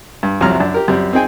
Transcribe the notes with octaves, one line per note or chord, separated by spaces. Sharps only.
G2
C2 F2 C3 F#3 A#5 F6
F#2 D4
G4 A#4
F#2 G3 C4
C4 D#4 G#4 G5 G#5